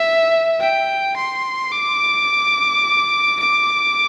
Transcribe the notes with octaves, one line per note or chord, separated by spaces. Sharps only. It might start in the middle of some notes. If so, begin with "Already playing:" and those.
Already playing: E5
G5
C6
D6
D6